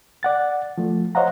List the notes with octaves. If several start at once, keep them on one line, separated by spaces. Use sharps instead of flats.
D5 F#5 A6
F3 A3
C5 C#5 D#5 F5 F#5 A#5